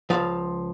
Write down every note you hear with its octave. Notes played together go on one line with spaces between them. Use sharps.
C#2 C#3 F3 F5